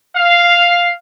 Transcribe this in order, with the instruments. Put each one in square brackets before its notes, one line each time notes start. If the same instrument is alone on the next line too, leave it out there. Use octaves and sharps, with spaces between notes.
[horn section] F5